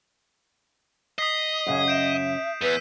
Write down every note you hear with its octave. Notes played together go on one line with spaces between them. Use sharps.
D#5 D#6 B6 C7
F#2 C#3 G#4
E5 G6 D7 E7
E2 B4 E6 B6 D#7